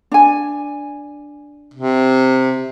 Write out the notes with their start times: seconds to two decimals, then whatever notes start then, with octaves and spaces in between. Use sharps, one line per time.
0.12 D4 G#5
1.74 C3